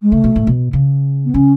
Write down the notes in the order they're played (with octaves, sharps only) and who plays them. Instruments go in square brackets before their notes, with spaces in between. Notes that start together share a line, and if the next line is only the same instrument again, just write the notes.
[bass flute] G#3
[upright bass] C#3 [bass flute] A3
[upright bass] B2
A2
B2
C#3
[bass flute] B3
[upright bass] C#3 [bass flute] C#4